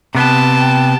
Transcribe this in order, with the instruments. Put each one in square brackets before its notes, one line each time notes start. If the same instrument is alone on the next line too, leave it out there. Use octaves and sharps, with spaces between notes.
[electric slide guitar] C3 B3 [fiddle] G5 A5